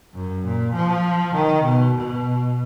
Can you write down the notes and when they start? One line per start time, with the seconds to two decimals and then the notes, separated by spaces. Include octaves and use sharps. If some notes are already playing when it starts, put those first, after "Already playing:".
0.15 F#2
0.45 A#2
0.75 F3
1.35 D#3
1.65 B2
1.95 B2